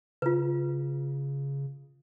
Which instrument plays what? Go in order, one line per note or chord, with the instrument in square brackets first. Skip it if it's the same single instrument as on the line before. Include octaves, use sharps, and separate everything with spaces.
[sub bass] C#3 [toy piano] F4 B4